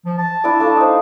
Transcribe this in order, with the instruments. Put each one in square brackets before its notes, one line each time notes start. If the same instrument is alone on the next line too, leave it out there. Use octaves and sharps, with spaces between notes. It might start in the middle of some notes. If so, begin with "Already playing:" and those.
[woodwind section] F3
A5
[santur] D4 E4 D5
A3 D4 F4
D#4 C5